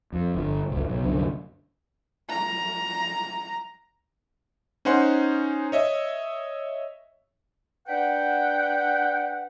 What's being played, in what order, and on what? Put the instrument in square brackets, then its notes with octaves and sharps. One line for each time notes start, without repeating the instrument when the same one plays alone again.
[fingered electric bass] F2
G1 D3
F#1 C#2 G#2
B1
C2 F#2 D3
[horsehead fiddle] A#5
[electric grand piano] C#4 D#4 C5 F#5 C6
C#5 D#5 E5
[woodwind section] D4 B4 F#5 [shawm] G5